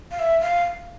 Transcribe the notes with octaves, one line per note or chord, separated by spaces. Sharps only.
F5
E5
F5